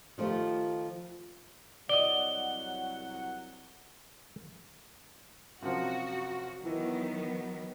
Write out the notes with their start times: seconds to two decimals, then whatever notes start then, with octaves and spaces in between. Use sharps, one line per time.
0.18 D#3 F3 A3 F4 G4
1.89 C2 F#3 D5 D#5 F#5 G7
5.62 F#2 C3 F3 F#4
6.65 D#3 E3 F#3 B3